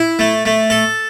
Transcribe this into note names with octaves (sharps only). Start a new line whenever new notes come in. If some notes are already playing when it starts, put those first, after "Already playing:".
Already playing: E4
A3
A3
A4